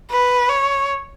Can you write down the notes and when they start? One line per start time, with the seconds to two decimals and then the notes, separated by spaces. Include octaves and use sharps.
0.11 B4
0.49 C#5